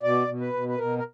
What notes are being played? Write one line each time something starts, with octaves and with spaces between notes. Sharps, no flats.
B2 D5
B2
B4
B2
B4
B2 A#4
A#4